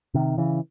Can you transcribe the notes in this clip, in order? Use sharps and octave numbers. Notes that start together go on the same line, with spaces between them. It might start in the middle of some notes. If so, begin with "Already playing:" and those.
C3 D#3
C#3 E3